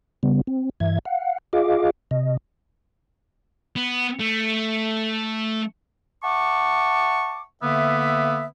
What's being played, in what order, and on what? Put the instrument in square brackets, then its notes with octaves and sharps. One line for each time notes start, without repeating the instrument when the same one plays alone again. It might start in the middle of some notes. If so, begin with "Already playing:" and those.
[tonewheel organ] C#3 G3 B3
C4
G2 E3 E5 G#6
F5 F#5
F4 G#4 D#5 F5 D6
C3 D#5
[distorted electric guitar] B3
A3
[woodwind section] E5 F#5 A5 C#6 D6
D3 A#3 B3 E5